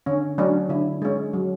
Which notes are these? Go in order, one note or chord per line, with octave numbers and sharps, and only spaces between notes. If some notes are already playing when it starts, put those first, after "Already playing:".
D3 C#4
F#3 A3 C#4 D4
D3 E4
G#3 C#4
F#3